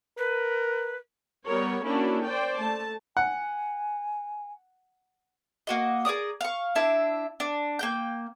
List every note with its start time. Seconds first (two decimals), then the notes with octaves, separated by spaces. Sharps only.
0.18 A#4 B4
1.46 G3 B3 A#4 C#5
1.85 A#3 C#4 D4 E4 F#4
2.25 C5 D5 G5
2.57 A3 A5
3.17 F#5 G#5
5.67 A#3 F#4 D#5
6.05 G#4 A#4 D5 D#6
6.41 F5 C#6
6.75 D4 E4 E5
7.40 D4
7.79 A#3 G5 G6